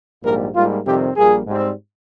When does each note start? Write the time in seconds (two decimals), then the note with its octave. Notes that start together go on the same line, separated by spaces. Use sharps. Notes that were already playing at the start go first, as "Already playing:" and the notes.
0.23 A#1 G#2 G3 A#3 A#4
0.55 G#2 G3 A#3 F4
0.85 F2 C3 D#3 G3 C4 G4
1.16 A#1 A#2 G3 A#3 G#4
1.46 G#2 G3 C4